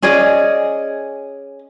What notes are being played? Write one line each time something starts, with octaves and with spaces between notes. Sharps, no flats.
C#4 G#4 D5 D#5